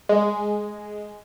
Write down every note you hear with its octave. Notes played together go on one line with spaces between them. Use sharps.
G#3